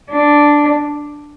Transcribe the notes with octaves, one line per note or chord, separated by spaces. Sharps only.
D4